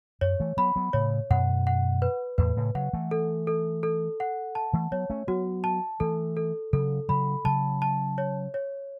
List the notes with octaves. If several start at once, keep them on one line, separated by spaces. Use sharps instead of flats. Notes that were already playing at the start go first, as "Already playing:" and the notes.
F#2 C#5
E3 A3
F#3 B3 B5
F#3 B3
A2 C#3 C#5
F#2 B2 F#5
F#5
B4
E2 A2 B4
A2 C#3
C#3 F#3 F#5
E3 A3
A4
A4
A4
F#5
A5
E3 A3
F#3 B3 C#5
A3 C#4
F#3 B3 F#4
A5
E3 A3 A4
A4
C#3 F#3 A4
C#3 F#3 B5
C#3 F#3 A5
A5
C#5
C#5